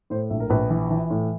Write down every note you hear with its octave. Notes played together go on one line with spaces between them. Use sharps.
A2 C5
A#1 E5
A#4
A#1 B4
E3
E3
A2